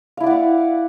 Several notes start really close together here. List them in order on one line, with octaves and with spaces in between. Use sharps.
F5 E4 D5 F#5